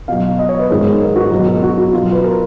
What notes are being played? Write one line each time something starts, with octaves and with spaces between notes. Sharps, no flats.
B2 F#3 F5
D#5
C#5
B4
G#2 D#3 G#3 A#4
A#4
F#4
B2 F#3
F#4
F#4
B2 F#3 F4
B4
A#4